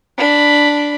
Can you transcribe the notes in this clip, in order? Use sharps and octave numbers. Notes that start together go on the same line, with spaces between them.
D4 B5